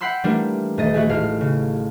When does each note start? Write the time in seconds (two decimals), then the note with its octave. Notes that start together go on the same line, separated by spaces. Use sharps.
0.01 F#5 G5 B5 C6 E6
0.24 E3 G3 A3 A#3 D4
0.77 D#1 A3 D#5 A6
0.94 G#3 A3 F#4
1.09 A1 F5
1.41 C#3